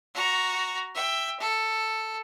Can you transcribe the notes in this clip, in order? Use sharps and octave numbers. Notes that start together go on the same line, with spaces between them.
F#4 A#5
E5 G5
A4